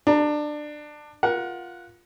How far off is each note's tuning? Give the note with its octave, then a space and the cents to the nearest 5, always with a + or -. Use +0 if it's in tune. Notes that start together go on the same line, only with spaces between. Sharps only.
D4 +20 A#5 +0
F4 +5 A#4 +30 F#5 +0